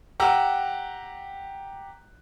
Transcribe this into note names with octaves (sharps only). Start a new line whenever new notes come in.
G4 F#5 A#5 E6